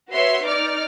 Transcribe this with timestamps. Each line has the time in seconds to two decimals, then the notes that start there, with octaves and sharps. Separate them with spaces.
0.11 F#4 B4 C#5 E5 C6
0.45 D#4 D5 D6 F6